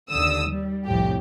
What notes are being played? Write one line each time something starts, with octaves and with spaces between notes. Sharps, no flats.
D#2 D3 D#6 E6
G3
C2 F2 A2 G4